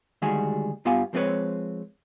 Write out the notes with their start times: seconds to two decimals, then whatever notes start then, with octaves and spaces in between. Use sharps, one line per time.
0.22 D2 D#3 G3 G#3 F#4 G#4
0.85 G2 B3 F4 G4 F5 G#5
1.13 F3 G#3 C4 D#4 B4 C#5